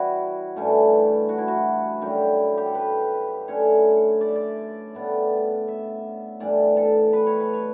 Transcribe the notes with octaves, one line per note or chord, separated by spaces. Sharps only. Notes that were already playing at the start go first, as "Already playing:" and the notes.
Already playing: C#3 E3 G3 E4 F#4
G2 E3 A3 C#4
F#4
E4
F#4
F#2 D3 G3 G4
G4
A4
B4
D3 A3 C#4 C#5
D5
E5
D5
A2 G3 B3
E5
A2 E3 G3 D4 D5
A4
B4
C#5
B4
C#5